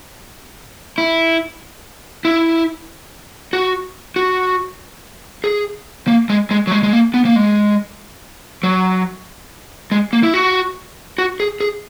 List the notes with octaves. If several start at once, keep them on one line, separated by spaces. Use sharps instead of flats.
E4
E4
F#4
F#4
G#4
A#3
G#3
G#3
F#3
G#3
G#3
A#3
B3
A#3
G#3
F#3
G#3
A#3
E4
F#4
F#4
G#4
G#4